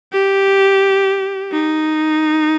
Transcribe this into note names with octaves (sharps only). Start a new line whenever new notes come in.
G4
D#4